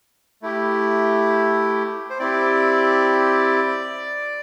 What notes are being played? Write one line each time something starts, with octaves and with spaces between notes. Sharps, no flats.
A3 E4 G4
C5
C4 E4 G4 D5